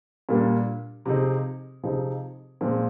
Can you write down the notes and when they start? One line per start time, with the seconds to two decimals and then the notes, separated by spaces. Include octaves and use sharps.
0.29 A#2 G3 A#3 D4
1.06 C3 F3 C4 D#4 G#4
1.84 C3 F3 C4 D#4 G#4
2.61 A#2 F3 G#3 C4